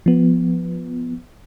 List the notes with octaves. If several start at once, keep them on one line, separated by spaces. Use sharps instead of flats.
F3 B3